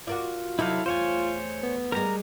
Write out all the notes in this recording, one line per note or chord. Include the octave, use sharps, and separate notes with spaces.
F4 F#4 A#4 D5
C3 F#3 D#4 E4 A4 F5
E2 A3 F4 C5 C#5 G#5
B3
G3 G#3 A#4 A#5